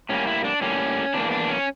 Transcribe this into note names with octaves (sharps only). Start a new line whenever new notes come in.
A2 G3 A#3 C#4
E4
D4
A2 G3 A#3 C#4
E2 E3 A#3 D4
D4
C#4